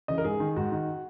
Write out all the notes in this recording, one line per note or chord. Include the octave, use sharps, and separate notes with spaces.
C#3 E3 D#5
A#4
G#2 G#4
D#3
G#2 F#4
D#3